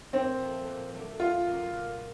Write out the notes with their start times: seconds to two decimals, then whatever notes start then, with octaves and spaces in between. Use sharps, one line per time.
0.13 A#2 C4
0.40 F3 A3
0.67 A#2
0.94 F#3 A3 D4
1.20 F#2 F4
1.47 C#3 F#3 A#3
1.74 A#2